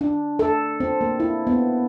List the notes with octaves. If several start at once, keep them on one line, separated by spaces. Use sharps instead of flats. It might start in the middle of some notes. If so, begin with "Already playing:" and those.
D4
A4
C4
A#3
E4
B3